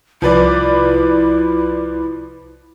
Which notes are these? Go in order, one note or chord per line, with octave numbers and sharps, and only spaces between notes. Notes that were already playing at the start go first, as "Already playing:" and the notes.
C2 F3 E4 B4 D5